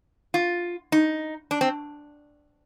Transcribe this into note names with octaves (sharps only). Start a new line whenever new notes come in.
F4
D#4
D4
C4